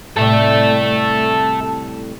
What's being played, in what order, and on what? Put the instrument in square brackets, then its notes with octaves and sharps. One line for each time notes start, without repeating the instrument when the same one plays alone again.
[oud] A2 C3 G3 [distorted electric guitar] A4 E5